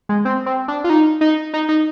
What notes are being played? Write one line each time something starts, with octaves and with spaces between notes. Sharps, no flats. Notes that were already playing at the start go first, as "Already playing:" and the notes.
G#3
C4
C4
D4
F4
D#4
D#4
D#4
D#4